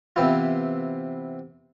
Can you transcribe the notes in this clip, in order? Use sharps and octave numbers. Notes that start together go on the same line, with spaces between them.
C3 E3 B3 C4 E4 F4